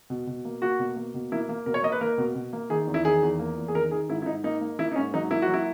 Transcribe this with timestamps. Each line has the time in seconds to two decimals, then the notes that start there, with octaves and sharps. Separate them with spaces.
0.10 B2
0.27 B2
0.45 A#3
0.62 A#3 F#4
0.79 B2
0.96 A#3
1.14 B2
1.32 A#3 E4
1.49 A#3
1.66 B2 A#4
1.74 C#5
1.83 A#3 D#5
1.92 B4
2.01 A#3 A#4
2.18 B2
2.35 B2
2.53 A#3
2.70 D#3 G#4
2.87 E2
2.94 E4
3.05 D#3 G#4
3.23 E2
3.39 A#3
3.57 E2
3.68 G#4
3.75 D#3 A#4
3.91 D#3 G#4
4.09 G#2 E4
4.22 E4
4.26 G#2 D#4
4.44 A#3 D#4
4.61 A#3
4.79 A#3 E4
4.92 D#4
4.96 G#2 C#4
5.14 F#3 D#4
5.31 A#3 E4
5.42 F#4
5.48 F#3
5.53 E4